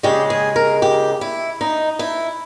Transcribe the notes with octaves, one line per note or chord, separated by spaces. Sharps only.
D#2 C#3 G#3 G4
G#4
A#4
G4
E4
D#4
E4